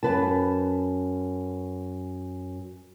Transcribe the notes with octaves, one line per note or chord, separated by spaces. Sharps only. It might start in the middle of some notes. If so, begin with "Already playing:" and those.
F#2 B4 A5